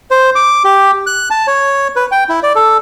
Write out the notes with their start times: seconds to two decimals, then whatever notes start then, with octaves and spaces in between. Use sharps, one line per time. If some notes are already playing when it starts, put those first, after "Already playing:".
0.11 C5
0.35 D6
0.65 G4
1.07 F#6
1.30 A5
1.47 C#5
1.96 B4
2.11 G5
2.29 E4
2.43 D5
2.55 A4